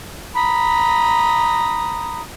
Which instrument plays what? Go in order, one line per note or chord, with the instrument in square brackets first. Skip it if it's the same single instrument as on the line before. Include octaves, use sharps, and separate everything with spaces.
[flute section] A#5 B5 D#6